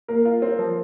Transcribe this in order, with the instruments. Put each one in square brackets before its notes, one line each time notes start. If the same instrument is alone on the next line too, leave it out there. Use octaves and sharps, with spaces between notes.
[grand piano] A#3 [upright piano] A#4
[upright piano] F4
C4
F3